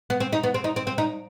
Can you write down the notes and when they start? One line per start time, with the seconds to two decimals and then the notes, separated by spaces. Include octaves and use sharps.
0.10 B3
0.20 C4
0.33 D#4
0.43 B3
0.54 C4
0.64 D#4
0.76 C4
0.87 C4
0.98 D#4